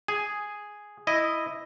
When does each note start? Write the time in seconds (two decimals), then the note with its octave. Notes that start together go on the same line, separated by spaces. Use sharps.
0.08 G#4
1.07 E4 D#5